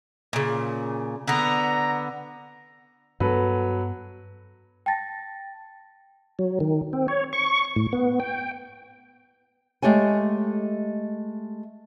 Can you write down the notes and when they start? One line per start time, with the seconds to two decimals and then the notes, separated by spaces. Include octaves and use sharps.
0.33 A#2 C#3
1.28 D3 B3 A#5
3.20 G2 F#3 B3 A4 B4
4.86 G5 A5 A6 A#6
6.39 F#3
6.60 D#3
6.93 C4
7.08 C#5
7.33 C#6
7.76 A2
7.93 B3
8.20 G5
9.82 G#3 A3 G4 C#5 G#5